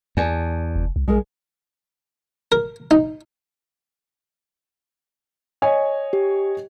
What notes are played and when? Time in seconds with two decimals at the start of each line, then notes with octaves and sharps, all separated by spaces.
0.17 E2 D5 G#5 A5
0.76 F1
0.96 C2
1.08 A#1 G#3 G#4 A#4
2.52 A#4
2.91 D#4
5.62 C#5 D#5 G#5
6.13 G4